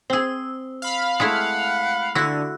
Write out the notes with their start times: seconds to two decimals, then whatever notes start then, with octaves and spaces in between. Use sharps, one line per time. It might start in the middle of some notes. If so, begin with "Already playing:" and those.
0.10 C4 G#4 C5 E6
0.82 F5 B5
1.20 G#3 A3 E4 F#5
2.15 D3 E4 F#4 E6 F#6